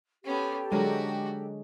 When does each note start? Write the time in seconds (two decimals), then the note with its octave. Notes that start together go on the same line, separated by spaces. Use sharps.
0.24 B3 C#4 G4 A4
0.72 D3 F#3 G#3 F#4 A#4